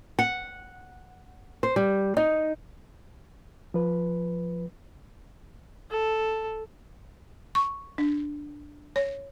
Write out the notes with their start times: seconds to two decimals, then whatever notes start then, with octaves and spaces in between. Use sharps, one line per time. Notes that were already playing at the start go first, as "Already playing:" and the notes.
0.19 F#5
1.63 C5
1.76 G3
2.17 D#4
3.74 F3 B4
5.90 A4
7.55 C#6
7.98 D4
8.96 C#5